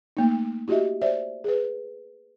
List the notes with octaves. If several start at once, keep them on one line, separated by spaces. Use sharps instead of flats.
A3 A#3 D#4
E4 F#4 G4 D#5 E5
C5 D5 E5
G#4 B4